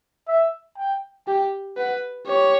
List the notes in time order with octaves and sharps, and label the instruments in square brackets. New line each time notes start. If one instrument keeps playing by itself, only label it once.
[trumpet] E5
G5
[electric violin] G4 [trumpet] G5
[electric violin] B4 [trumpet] F#5
[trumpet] G4 [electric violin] C#5